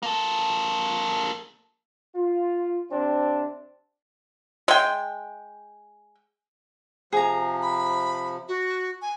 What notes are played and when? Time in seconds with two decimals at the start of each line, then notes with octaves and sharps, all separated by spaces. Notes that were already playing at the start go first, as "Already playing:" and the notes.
0.03 A#3 A4
2.15 F4
2.92 C3 C4 D4
4.68 G#3 G5
7.13 C3 F3 G#4 A#5
7.62 B5
8.48 F#4
9.02 G#5